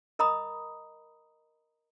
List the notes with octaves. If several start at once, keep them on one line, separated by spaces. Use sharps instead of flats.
A#4 D#5 A#5 B5 D#6